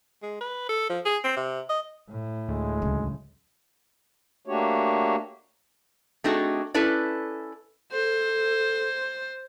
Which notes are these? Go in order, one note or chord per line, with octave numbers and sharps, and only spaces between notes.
G#3
B4
A4
F3
G#4
C4
C3
D#5
A2
D2 G#3
C#2 F#3
A3 A#3 D4 F#4 G4 C#5
A3 C4 D4 D#4 F#4 G#4
C#4 E4 A4 B4 D5
A4 C5